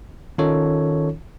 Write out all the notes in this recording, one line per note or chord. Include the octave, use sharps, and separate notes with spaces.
D#3 C#4 D#4 F4 A4 C#5